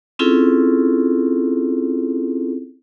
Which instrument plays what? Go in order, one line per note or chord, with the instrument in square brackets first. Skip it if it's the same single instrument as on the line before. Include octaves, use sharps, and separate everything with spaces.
[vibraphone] C4 C#4 E4 F4 G#4 A4